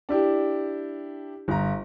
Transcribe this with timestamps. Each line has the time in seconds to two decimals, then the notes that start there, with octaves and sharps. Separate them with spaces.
0.09 D4 E4 G4
1.48 G1 A#5